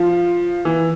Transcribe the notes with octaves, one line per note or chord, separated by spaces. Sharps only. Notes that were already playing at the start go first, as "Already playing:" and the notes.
Already playing: F3
E3